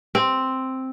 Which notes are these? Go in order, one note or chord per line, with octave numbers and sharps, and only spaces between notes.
C4